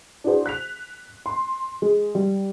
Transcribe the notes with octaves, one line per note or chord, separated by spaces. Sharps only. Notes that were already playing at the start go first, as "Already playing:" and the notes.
D4 E4 F#4 G#4 C5
F#6 B6 F7
C6
G#3
G3